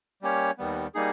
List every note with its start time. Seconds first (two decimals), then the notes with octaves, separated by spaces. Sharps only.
0.22 G3 A#3 C#4 G4 C#5
0.58 D#2 D#3 G3 B3
0.95 G3 A#3 D#4 G#4